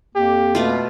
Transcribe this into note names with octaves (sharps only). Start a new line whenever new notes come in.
F2 A#3 G4
B2 A3 F4